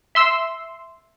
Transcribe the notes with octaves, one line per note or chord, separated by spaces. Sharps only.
E5 C6 E6